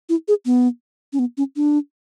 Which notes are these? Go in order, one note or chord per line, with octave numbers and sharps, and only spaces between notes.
E4
G#4
B3
C#4
B3
C#4
D4